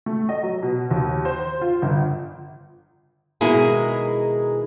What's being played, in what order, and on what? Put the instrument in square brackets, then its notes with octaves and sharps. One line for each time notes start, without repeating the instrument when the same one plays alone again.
[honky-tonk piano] A3
D#5
F#3
B2
D#2
C5
F4
G1
[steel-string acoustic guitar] B2 D#3 G#3 E4 G#4 A#5